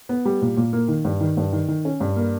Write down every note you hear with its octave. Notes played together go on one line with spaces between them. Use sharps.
B3
G3
A#2
A#2
A#3
D#3
G2
D#3
G2
D#3
D#3
C#4
G2
A#3